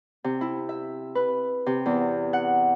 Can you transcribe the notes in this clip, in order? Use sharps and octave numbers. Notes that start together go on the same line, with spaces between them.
C3
E4
E5
B4
C3
E2
F#5